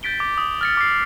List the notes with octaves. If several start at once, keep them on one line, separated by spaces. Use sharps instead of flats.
G6 A6 B6 D7 G7
D6
D#6
F6 A6 C#7
D6 A6 C7